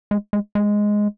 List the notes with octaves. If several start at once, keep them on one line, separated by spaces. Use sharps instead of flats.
G#3
G#3
G#3